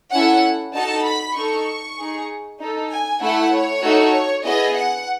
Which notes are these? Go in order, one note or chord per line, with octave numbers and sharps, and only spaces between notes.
C#4 E4 A4 F#5
D#4 F#4 A4 A5
B5
D#4 A4 C#6
D#4 G#4
D#4 A4
G#5
A3 E4 A4 F#5
C#5
A3 D#4 F#4 A4
B3 E4 G#4 D#5
F#5